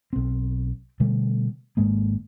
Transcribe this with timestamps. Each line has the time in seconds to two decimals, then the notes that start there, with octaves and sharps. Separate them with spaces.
0.13 B1 C4
1.00 B2 D3 G3 A3
1.77 G#1 G#2 G#3 A#3